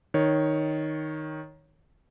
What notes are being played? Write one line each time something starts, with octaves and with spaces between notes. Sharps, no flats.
D#3 C#5